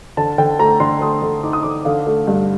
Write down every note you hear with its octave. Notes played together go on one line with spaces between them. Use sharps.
D3 A5
D3 G5
A3 A#5
D3 C6
A3 D#6
D3
D#4 D6
D#6
D3 D6
D3 F5
A3
G2